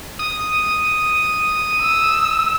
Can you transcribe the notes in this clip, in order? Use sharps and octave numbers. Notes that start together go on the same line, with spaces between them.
D#6
E6